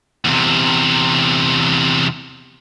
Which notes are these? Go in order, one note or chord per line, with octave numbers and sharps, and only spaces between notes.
E2 C3